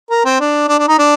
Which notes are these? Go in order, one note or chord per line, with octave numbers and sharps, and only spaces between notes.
A#4
C4
D4
D4
D4
D#4
D4